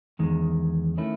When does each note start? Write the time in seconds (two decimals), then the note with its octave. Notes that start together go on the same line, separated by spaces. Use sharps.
0.19 E2 D#3 G#3
0.97 D#3 A3 C#4 E4